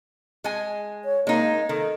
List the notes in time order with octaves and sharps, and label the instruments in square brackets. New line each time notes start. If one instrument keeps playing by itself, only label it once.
[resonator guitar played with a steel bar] G#3 G#5
[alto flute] C#5
[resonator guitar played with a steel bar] G#3 D#4 [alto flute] A#3
[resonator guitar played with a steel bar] D#3 [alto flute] A4